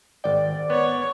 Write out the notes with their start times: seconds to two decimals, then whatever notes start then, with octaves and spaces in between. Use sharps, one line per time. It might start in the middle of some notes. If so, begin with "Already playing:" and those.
0.24 G#1 D5 G5
0.70 B3 C#5